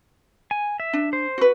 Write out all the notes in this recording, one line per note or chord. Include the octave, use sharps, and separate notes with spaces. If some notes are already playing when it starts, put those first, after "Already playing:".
G#5
E5
D4
C5
F#4 B4